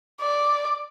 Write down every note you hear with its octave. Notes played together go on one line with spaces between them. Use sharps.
D5